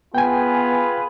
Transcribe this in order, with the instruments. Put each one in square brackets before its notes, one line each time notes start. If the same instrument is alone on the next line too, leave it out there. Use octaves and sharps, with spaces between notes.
[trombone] B3 [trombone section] F4 G#4 B4 [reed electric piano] G5 G#5